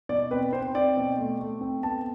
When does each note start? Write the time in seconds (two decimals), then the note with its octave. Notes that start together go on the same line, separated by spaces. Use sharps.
0.09 B2 D5
0.31 C4 B4
0.53 C4 C5
0.75 C4 D5
0.97 B2
1.19 A3
1.40 A3
1.61 C4
1.83 B3 A5